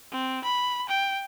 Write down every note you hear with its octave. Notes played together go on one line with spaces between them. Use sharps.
C4
B5
G5